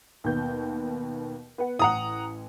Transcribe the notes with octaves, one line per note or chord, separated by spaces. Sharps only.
D#2 B2 G6
B3 F#5
A1 F#5 A#5 D#6